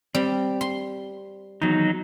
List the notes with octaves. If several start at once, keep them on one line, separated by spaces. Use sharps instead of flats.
G3 C4
C6
E2 D#3 F#3 D#4